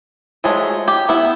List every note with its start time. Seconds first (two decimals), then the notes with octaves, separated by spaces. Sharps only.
0.44 F3 F#3 G#3 A3
0.88 G4
1.09 B3 E4